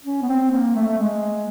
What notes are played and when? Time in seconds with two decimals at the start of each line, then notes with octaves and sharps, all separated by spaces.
0.05 C#4
0.22 B3
0.28 C4
0.51 A#3
0.75 A3
0.88 A3
0.97 G#3